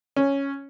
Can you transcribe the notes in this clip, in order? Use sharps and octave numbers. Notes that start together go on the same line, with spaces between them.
C#4